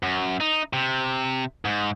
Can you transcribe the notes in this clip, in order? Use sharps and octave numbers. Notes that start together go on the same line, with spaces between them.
F#2
D#4
C3
G#2